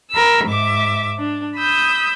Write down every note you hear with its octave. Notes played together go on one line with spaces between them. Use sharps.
A#4 B5 E6
G#2 E5 D6
D4
B5 D#6 E6 G6